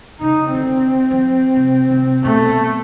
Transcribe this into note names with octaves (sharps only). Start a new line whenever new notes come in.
C#3 D#4
D3 C4
F3
C3
C3
B2 A3